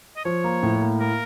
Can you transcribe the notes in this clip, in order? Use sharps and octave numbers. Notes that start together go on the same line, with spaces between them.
D#5
F3 C#5
A#3
A2
A#3
A#3 A#4